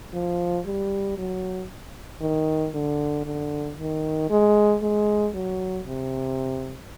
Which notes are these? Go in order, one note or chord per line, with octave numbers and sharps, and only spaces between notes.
F3
G3
F#3
D#3
D3
D3
D#3
G#3
G#3
F#3
C3